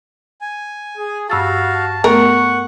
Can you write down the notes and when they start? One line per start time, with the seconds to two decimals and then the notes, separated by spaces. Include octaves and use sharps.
0.41 G#5
0.97 G#4
1.30 G2 F#4 F5 A5 E6 A6
2.04 A3 B3 A4 A#4 F#5 C#6